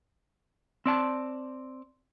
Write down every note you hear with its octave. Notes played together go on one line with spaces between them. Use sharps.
C4 D5 A5